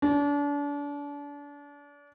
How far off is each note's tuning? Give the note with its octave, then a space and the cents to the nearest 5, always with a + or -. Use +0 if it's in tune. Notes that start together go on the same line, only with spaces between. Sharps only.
D4 -35